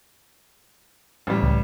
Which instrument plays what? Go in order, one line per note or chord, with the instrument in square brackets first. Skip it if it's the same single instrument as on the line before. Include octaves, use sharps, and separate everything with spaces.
[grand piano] A1 G3
[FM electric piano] C#2